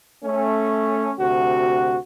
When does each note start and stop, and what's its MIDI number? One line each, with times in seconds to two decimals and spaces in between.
0.24 1.13 57
0.24 1.13 61
1.19 1.96 38
1.19 1.96 48
1.19 1.96 66